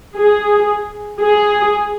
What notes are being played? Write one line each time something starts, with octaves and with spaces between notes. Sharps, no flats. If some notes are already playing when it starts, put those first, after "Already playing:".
G#4
G#4